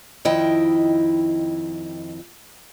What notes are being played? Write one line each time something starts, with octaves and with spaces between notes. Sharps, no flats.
F2 D#3 E4 D#5 G5